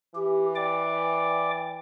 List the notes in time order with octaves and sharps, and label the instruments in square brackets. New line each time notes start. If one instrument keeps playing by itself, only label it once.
[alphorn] E3 [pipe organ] G4
[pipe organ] D5 G5 D6